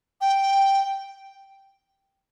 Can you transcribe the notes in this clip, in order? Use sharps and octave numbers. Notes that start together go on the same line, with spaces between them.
G5